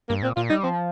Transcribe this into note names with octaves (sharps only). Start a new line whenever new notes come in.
G2 A#3
A#2 C4
A#2 F4
G3 D#4
F3 C4